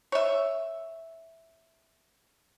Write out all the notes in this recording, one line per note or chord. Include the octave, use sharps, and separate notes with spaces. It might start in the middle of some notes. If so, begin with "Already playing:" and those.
C#5 E5